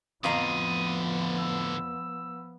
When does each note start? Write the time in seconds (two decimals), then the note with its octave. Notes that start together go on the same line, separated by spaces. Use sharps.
0.24 F2 A2 D3 F3 B3 F5 A#5 D#6
1.39 E6